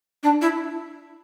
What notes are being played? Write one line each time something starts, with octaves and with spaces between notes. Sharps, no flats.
D4
E4